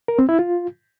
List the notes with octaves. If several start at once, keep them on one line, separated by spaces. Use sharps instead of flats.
A#4
C4
E4
F4